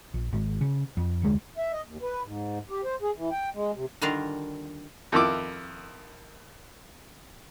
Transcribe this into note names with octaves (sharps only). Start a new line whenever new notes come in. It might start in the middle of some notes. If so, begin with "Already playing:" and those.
A#1
G#1
C#3
F2
F1 D2 G#3
E5
D#5
D#2
B4
G#2
G4
C5
G#4
E3
G5
G#3
C3
D3 D#3 G3 D4 F4 A#4
F2 D#3 E4 D6